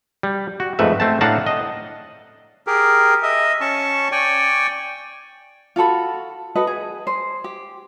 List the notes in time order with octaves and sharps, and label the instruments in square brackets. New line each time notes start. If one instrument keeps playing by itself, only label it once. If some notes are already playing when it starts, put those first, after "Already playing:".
[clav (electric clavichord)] G3
F#4
F2 G#2 A3 B4 E5
A3 C4 A5
A2 D4 F5 F#5 A5 A#5
D#5
[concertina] G4 G#4 A#4
D#5 E5
C#4 A5 C#6
D5 G5 G#5 C#6
[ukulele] F4 F#4 A4 B5
F#4 A4 B4 D#5
G#4
C5
G4